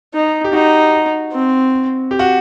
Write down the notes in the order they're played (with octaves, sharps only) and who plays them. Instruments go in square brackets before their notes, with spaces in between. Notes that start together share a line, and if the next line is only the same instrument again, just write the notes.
[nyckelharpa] D#4
[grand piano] G4
[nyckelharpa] D#4 [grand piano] F#4
[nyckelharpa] C4
[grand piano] G4
F#4